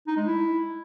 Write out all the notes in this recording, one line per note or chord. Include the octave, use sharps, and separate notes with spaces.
D#4
G#3
E4